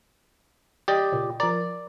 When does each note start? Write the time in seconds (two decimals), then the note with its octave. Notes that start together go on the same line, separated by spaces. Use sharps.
0.88 G4 D5 D#5
1.12 C#2 A#2
1.40 F3 A#4 D5